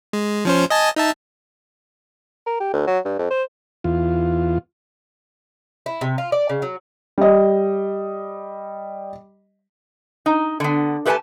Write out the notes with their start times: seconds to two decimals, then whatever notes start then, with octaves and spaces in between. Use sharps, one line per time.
0.13 G#3
0.45 F3 C#4 C5
0.70 D#5 G#5 A5
0.96 D#4 E5 A5
2.46 A#4
2.60 G4
2.73 D2
2.87 F#3
3.05 G2
3.19 F2
3.31 C5
3.84 E2 F4
5.86 E4
6.01 C3
6.18 F4
6.32 D5
6.49 C#3
6.62 F#3
7.18 G3 D#5
10.26 D#4
10.60 D3 B3
11.05 A3 G4 B4 F#5 G#5 A5